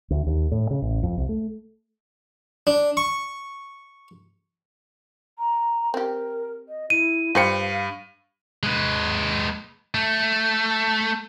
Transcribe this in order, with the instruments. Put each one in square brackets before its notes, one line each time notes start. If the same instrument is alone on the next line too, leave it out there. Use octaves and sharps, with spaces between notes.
[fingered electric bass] D2
D#2
A2
C#3
A1
F2
C2
A3
[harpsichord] D4
C#6
[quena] A#5
[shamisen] C4 G4 [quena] A#4
[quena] D#5
[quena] E4 [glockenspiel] D#7
[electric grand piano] G2 C#7 [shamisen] F4 C5 G5 [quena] F5
[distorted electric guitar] G#3 B4
A3